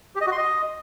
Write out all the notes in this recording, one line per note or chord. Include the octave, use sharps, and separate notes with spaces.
G4
D#5
F#4
C6
D#5